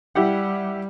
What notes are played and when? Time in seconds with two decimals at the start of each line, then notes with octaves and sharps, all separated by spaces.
0.15 G3 E4 G4 F#5